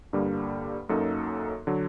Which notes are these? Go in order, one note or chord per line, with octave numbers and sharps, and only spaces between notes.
G2 D3 G3 A#3
F#2 F#3 A#3 D#4 A4
D3 F#3